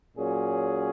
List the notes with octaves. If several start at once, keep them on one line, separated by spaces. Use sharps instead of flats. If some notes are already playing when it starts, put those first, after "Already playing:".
A#2 F#3 C#4 G#4